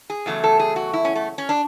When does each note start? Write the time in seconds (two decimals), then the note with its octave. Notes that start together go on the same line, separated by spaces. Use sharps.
0.10 G#4
0.26 E2 C#3 F#3 A3
0.44 A4
0.60 G#4
0.76 F#4
0.93 E4
1.05 C#4
1.15 A3
1.38 C#4
1.49 D4